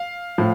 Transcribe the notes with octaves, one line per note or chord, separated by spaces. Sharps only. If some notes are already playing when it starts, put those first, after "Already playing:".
Already playing: F5
A2 F3